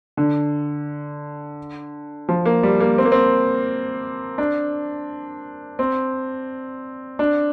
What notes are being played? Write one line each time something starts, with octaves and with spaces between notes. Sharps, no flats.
D3
F3
A#3
G3
A#3
C4
A#3
C4
D4
C4
D4